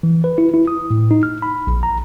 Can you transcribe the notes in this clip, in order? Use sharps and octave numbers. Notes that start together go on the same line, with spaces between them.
E3
B4
E4
E4
D#6
A2
D#4
F6
B5
A#1
A#5